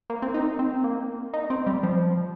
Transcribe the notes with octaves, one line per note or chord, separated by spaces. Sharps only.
A#3
C4
D#4
C4
A#3
D#4
C4
G3
F3